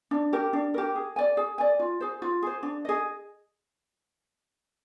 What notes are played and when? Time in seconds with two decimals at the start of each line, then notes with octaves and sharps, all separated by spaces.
0.11 D4
0.33 G4 A#4
0.53 D4
0.74 G4 A#4
0.95 G#4
1.16 D5 G#5
1.37 G#4
1.58 D5 G#5
1.80 F4
2.00 G#4 C5
2.22 F4
2.42 G#4 C5
2.63 D4
2.85 G#4 D#5